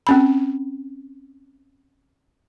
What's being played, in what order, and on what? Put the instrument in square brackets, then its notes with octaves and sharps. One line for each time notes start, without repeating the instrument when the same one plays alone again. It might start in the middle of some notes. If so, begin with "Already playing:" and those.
[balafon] C4 C#4 B5